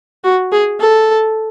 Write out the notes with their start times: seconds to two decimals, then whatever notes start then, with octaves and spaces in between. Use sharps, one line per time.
0.24 F#4
0.52 G#4
0.80 A4